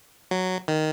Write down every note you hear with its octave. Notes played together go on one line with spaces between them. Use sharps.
F#3
D#3